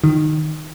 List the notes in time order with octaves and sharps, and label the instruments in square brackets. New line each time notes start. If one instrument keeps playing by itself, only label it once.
[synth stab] D#3